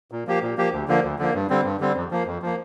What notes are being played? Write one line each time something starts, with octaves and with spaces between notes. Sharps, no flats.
A#2
F3 A#3 G4
A#2
F3 A#3 G4
D2
D3 F3 A#3
D2
D3 F3 A#3
G2
D3 G3 C4
G2
D3 G3 C4
F2
F3 A#3
F2
F3 A#3